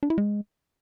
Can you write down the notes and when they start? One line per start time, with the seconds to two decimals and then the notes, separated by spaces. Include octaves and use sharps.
0.03 D4
0.10 E4
0.18 G#3